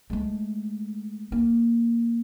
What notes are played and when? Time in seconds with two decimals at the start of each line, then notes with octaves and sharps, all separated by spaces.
0.10 G#3 A3
1.32 A#3